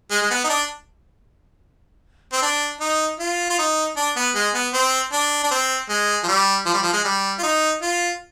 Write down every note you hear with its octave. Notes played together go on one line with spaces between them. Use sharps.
G#3
G#3
B3
D#4
D4
C4
D4
D#4
F4
F4
D#4
D4
B3
G#3
B3
C4
D4
D4
C4
G#3
F3
G3
F3
G3
F3
G#3
G3
F4
D#4
F4